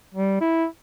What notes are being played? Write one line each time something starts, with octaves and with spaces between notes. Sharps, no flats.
G3
E4